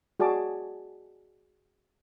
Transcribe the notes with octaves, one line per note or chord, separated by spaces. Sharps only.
F#4 G#4 D5 A5 D6